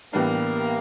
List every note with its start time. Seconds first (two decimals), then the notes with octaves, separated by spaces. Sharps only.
0.13 A2 E3 G3 A#3 B3 D4